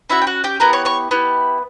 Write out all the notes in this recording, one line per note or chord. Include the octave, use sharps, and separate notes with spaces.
C#4 E4 F#4 E5
G5
F#4 F#5
G4 G5
B3 E4 G4 A#4 A#5
C#5 C#6
C#5 C#6
B3 E4 G4